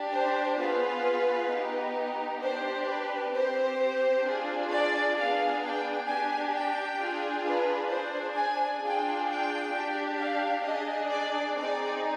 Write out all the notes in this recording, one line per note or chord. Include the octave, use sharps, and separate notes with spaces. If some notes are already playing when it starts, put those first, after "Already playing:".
Already playing: D4 G4
C5
B3 F4 G#4 B4
B3 D#4 G4
D4 G4 C5
B4
C4 G4 C5
D4 F4 G#4
D5
B3 D4 G#4 F5
G5
D4 G4 G#5
G5
D4 F4 G#4
B4
D4 G#4 C5
G#5
D4 F4 G#4 G5
G5
D4 G4
F5
D4 G#4 D#5
D5
C4 D#4 G#4 D5